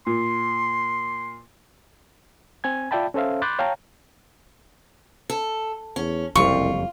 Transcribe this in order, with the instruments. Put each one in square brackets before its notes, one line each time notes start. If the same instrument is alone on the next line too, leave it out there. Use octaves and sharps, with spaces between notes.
[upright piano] A#2 [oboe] C6
[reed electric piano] C4 G#5 G#6
F4 D5 E5 G5 A5 B5
C#4 A4 C5 E5 F5
B5 C6 D6 F#6 G6 A6
C#5 F5 G5 A5 A#5
[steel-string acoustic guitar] A4
[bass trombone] E2 [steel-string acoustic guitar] C#4
[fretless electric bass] F#1 F2 G3 [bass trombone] C2 [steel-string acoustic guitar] F4 [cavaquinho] C#6